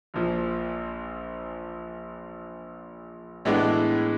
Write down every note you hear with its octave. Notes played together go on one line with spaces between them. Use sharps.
A#1 A#2 F3
A2 E3 G#3 B3 D4